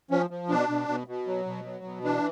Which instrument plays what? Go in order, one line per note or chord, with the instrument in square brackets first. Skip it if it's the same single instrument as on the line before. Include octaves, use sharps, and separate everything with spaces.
[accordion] F3 C#4
F3
B2 D4
B2
B2
B2
F#3
B2
F#3
B2
E3 D4